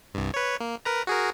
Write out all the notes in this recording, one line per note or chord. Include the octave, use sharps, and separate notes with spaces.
C2 G2
B4 C#5
A#3
A#4 B4 A#5
F#4 G#4 A#4